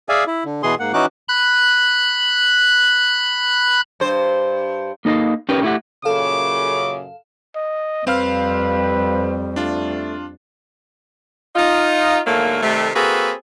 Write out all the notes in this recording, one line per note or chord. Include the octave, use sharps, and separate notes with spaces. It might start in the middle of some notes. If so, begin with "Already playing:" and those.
G#4 D5 E5 F5 G#5
E4
D3
B2 E3 G#4 C6
G#2 A#3 F#5
E3 C#4 D#4 F#4 D6 F#6
B5 F#6
G2 C5
A#3 D#4 A4 D#5 F5
C#4 D#4 G4 A#4 B4
A3 E4 G4 F#5
F#2 A#2 C#3 A4 F5 D6
D#5
F2 G3 C4 B4 F5 F6
A3 D4 F4
D#4 F4
G#2 D3 F#3 A3 A#3
C3 D#3 G3 A3
A#3 C4 F#4 G#4 A4 B4